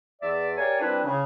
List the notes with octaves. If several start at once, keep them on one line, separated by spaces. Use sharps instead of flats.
E2 D5 E5
G4 A#4 C#5 D5 F5 G#5
G3 C4 D4 E4 B4
C#3